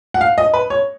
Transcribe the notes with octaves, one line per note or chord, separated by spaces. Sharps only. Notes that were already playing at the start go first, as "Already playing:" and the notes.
F#5
F5
D#5
B4
C#5